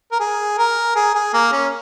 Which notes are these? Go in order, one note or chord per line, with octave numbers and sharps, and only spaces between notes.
A#4
G#4
A#4
G#4
G#4
A#3
C#4